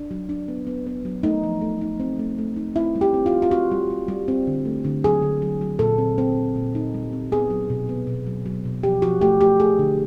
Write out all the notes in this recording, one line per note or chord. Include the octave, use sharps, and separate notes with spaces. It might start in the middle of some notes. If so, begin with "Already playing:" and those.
Already playing: D4
F#3
D4
B3
B3
B3
F#3
A3 D#4
F3
A3
D#4
C4
A3
A3
D#4
C4 E4
G3
G4
C4
F4
C4
F4
C4 F#4
G3
G3
G3
C4
D3
A3
D3
F#3 G#4
D3
F#3
F#3
A#2 A4
C4
C4
A#2
A#2
D#4
G3
C4
B3 G#4
F#3
B2
B3
B2
F#3
F#3
B2
F3 G4
F3 F#4
A3 G4
A3 G4
A3 G#4
D3